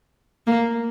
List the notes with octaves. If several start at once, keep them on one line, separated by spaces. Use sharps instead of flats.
A#3